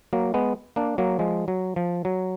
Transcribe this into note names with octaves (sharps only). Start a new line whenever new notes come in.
F#3 A#3
G#3 B3
A#3 D4
F#3 A#3
F3 G#3
F#3
F3
F#3